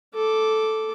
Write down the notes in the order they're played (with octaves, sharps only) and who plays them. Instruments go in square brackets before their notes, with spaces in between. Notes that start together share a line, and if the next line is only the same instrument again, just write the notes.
[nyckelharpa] A4 D6